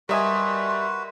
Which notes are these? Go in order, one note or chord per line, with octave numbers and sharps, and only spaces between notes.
G3 F#4 A#4 B4 D#5 E5 G#5 C6